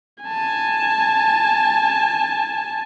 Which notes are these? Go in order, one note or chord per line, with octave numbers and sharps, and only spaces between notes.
G#5 A5